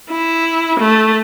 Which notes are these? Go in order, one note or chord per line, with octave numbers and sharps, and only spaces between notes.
E4
A3